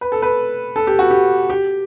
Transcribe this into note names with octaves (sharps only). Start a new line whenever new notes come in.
B4
A4
B4
A4
G4
F#4
G4
G4